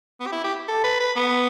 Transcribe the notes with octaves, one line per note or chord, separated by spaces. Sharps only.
B3
G4
E4
G4
A4
B4
B4
B3